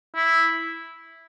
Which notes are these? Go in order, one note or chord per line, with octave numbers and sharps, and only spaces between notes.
E4